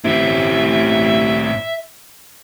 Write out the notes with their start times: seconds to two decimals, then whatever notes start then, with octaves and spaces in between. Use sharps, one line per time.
0.04 A1 A2 C4 E5